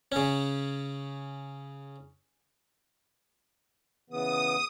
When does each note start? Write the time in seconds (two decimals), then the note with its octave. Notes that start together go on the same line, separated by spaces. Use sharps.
0.12 C#3 C#4
4.10 C#3 E3 B3 D#6